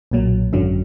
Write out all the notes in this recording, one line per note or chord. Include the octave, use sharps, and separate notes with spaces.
B1 A#2 F#3
G#1 F#2 D3 F#3